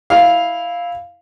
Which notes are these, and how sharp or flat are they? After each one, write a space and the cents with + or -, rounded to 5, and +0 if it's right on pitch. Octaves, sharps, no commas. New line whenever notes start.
E4 -10 F5 +0